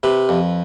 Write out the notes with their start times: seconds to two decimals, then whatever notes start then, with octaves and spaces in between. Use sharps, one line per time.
0.03 C3 B4
0.29 F2